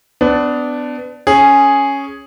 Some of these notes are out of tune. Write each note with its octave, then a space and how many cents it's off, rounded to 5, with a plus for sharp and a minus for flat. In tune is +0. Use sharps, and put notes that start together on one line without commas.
B3 +30 D4 +0
C#4 +0 G#4 +0